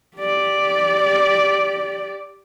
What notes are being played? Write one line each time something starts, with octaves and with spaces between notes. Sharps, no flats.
G4 D5